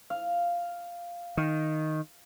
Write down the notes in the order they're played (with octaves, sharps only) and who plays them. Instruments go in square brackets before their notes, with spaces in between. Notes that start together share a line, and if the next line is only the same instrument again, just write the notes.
[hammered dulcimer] F5
[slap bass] D#3